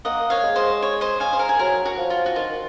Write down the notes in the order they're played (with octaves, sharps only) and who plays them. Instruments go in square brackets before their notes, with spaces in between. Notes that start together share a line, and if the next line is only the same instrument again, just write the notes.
[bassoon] A#3 [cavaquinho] D#5 F#5
[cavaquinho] C#5 F5
[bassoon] G#3
[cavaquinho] C5 D#5
C#5
C5 D#5
F5 G#5
C5
A#4
G#4
[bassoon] F#3 [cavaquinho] A#4
[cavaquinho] F#4
[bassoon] F3
[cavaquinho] F4
F#4
[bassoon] D#3 [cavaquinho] F4